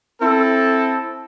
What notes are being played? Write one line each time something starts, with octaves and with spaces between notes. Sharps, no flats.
C4 E4 A4